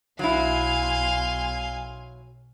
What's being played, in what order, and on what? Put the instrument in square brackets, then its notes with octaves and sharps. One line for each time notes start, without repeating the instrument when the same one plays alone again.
[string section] B1 G#5 [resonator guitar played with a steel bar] F#3 E4 [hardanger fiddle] F5 C6